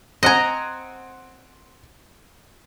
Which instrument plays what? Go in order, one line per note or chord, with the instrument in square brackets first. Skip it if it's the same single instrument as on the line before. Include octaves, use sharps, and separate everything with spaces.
[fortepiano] C4 F#5 G#5 [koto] D#5 A#5